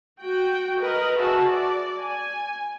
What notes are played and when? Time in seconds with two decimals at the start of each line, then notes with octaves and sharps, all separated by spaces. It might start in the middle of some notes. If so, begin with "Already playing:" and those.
0.21 F#4 G5
0.80 A#4 B4 D#5
1.18 F#4 G#4 E5 A5
1.48 D5
2.00 G#5